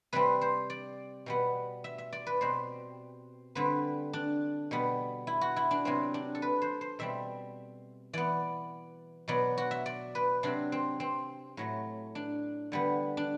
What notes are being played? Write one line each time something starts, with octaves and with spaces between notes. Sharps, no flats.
C3 G3 C4 B4
C5
D5
B2 G3 B3
E5
E5
D5
B4
B2 G3 C4 C5
D3 G3 C4 B4
D4
B2 G3 B3
E4
F#4
E4
D4
C3 F#3 B3 C4
D4
A4
B4
C5
C5
B2 G3 C4 E5
E3 B3 D5
B2 F#3 B3 D5
F#4
E5
D5
B4
C3 F#3 C4 D4
C4
C4
A2 F#3 A3
D4
D3 G3 B3
D4